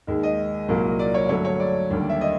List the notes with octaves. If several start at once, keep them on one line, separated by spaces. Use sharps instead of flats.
D#2 D#3 G#3
D#5
C2 A#2 F#3 A#3
D5
C#5
G2 D3 F#3 A3 C#5
C#5
D5
D#2 D3 G3 A#3
E5
D#5